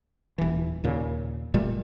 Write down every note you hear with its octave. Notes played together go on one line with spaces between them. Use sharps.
D#1 E3
D#2 A#2 C#3
F1 A#2 G3 A3